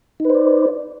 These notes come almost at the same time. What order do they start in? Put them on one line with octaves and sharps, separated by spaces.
D#4 B4 C5 D5